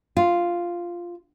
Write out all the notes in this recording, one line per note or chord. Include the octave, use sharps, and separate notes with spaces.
F4